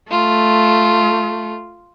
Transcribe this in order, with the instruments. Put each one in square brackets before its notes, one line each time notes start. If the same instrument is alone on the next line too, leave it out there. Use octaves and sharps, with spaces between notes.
[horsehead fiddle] A3 [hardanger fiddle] F4